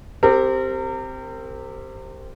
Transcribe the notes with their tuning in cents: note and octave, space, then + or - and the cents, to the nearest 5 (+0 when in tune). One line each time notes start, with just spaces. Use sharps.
C4 +0 G4 +0 A#4 -35